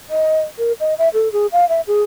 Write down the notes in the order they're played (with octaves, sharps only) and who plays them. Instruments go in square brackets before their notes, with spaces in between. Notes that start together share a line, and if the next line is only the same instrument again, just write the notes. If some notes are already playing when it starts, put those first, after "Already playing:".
[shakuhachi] D#5
A#4
D#5
E5
A4
G#4
F5
E5
G#4